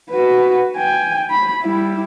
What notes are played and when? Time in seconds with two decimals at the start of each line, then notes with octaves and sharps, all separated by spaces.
0.11 F#4 B4
0.76 G5 G#5
1.30 B5
1.63 G3 E4